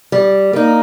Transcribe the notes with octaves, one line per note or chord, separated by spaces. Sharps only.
G3
A#3 D#4